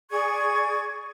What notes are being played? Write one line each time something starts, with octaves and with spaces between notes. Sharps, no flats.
G#4 D5 C#6 G#6